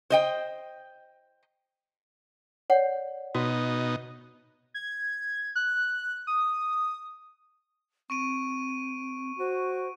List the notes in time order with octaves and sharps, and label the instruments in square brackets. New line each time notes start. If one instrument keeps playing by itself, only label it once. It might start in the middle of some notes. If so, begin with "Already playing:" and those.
[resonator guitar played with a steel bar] C5 D#5 G5
[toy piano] C#5 D5 F#5
[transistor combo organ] B2 D#4 [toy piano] F#4
[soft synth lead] G#6
F#6
D#6
[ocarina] C4 [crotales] C#6 D7 D#7
[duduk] F#4 [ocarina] C5